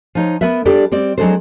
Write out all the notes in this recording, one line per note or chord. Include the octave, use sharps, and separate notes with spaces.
F3 D#4 C#5
B3 A#4 B4 E5
G3 D4 G4 A4 D5
G3 C4 D5
F#3 G#3 C4 D4 A4 C5